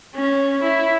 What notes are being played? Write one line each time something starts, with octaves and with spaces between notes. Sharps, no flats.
C#4
E4